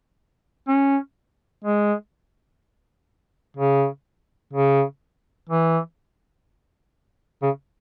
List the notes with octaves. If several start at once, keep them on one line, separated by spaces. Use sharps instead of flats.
C#4
G#3
C#3
C#3
E3
C#3